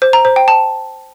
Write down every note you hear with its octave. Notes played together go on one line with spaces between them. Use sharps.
C5
A#5
C5
G5
A5